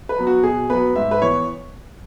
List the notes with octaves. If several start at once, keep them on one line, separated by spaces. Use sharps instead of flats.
B4
F#3 B3
F#4
B2 G#4
F#3 B3 B4
G#2 E5
B4
E3 B3 C#5